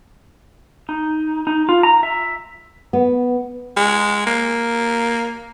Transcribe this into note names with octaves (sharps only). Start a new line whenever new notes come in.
D#4
D#4
F4
A#5
E5
B3
G#3
A#3